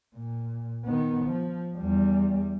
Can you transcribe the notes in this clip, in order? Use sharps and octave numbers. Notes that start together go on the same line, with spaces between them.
A#2
D#3 B3
F3
E2 G3